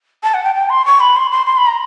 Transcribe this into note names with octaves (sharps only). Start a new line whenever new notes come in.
A5
F#5
G5
G5
C6
C#6
B5
C6
C6
C6
B5
A#5